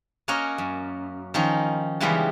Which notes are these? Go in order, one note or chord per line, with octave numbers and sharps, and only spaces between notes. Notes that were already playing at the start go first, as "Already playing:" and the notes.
A#3 C#4 F#4 A#4 C#5 D#5
F#2
D#3 F3 C#4 D#4
C#3 E3 G3 G#3 B3 C#4